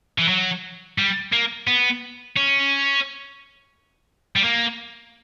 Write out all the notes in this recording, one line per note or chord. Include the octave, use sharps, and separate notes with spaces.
E3
F#3
G3
A#3
B3
C#4
G3
A#3